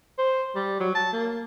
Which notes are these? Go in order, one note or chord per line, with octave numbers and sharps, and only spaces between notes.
C5
G3
F#3
A5
A#3